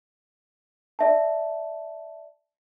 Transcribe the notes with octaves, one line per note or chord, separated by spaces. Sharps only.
D5 E5 A5